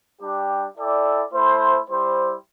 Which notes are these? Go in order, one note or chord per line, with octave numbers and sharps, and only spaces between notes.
G3 D4 G4
E4 A4 D5 G5
A3 E4 C5
G3 E4 C5